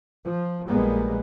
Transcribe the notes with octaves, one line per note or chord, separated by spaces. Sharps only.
F3
A#1 G3 G#3 A#3 B3